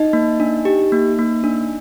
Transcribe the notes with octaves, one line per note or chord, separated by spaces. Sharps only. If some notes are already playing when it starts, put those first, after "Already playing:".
Already playing: D#4 D#5
A#3
D4
G4
A#3
A#3
D4